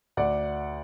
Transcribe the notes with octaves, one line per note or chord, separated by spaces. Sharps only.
D2 D5 F#5